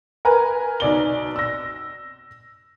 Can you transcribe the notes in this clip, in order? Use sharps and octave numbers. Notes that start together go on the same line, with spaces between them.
A#4 B4 G#5 A#5
B1 D5 G7
E6 A#6